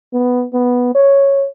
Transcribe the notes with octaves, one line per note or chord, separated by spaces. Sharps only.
B3
B3
C#5